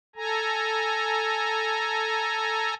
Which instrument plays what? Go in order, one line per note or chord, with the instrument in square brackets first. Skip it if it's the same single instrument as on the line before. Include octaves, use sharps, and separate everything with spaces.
[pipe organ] A4 G#5 A#5